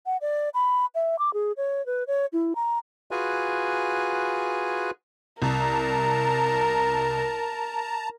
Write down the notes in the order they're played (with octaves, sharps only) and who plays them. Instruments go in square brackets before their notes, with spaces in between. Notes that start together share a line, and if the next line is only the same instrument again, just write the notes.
[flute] F#5
D5
B5
E5
D6
G#4
C#5
B4
C#5
E4
A#5
[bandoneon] F4 F#4 G#4 B4 G#5
[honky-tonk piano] C2 [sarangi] A#4 [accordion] A5 A#5